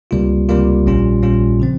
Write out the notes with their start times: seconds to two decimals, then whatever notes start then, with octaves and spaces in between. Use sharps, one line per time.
0.11 C#2 C3 G3 A#3 F4
0.49 C#2 C3 G3 A#3 F4
0.86 A#1 A#2 G3 C#4 F4
1.23 A#1 A#2 G3 C#4 F4
1.60 C#3 F3 C4